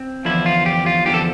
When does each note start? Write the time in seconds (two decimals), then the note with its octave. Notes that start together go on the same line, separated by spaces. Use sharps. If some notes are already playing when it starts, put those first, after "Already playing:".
Already playing: C4
0.25 E2 D3 F3 E4
0.46 F4
0.66 G4
0.86 F4
1.06 E2 D3 F3 G4
1.14 A4